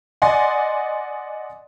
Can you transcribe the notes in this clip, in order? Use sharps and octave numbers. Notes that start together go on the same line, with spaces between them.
D5 D#5 F#5 G#5 C6